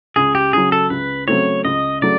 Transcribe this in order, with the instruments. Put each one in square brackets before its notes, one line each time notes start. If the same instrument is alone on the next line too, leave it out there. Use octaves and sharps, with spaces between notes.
[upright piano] C#2 [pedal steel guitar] G#4
[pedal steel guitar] G4
[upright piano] C#3 F#3 [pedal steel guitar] G#4
[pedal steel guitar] A4
[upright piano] C#2 [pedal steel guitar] B4
[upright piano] C#3 F#3 A3 C4 [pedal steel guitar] C#5
[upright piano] C#2 [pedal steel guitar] D#5
[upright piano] C#3 F#3 A3 [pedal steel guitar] D5